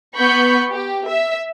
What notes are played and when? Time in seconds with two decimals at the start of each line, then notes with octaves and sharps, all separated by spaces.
0.15 B3 B5 C#6 G6
0.68 G4
1.04 E5